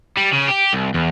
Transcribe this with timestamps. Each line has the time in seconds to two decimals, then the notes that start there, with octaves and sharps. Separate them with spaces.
0.17 G3
0.33 C#3
0.49 G4
0.73 C2
0.94 E2